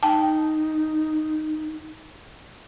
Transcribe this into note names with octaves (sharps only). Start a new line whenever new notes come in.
D#4 G5 A5